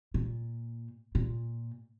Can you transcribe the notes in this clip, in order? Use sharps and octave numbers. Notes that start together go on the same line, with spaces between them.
A#2
A#2